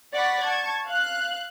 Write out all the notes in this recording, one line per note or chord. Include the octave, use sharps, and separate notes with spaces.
D5 F#5 B5 C#6 B6
A5 C#6 G#6
F5 F#6